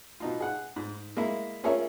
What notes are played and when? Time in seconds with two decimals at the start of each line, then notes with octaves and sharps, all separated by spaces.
0.20 B2 D#4 F4
0.40 G#4 F#5
0.76 G#2
1.17 G#3 A#3 E4
1.64 C#4 F4 G#4 A#4 C#5 E5